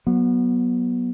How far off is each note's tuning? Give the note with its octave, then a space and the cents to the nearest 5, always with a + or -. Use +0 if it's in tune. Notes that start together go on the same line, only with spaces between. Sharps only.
F#3 +0 B3 -25